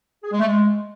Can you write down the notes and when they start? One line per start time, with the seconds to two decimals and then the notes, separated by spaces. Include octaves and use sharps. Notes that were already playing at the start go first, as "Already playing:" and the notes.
0.24 G#4
0.32 G#3
0.39 A3
0.47 G#3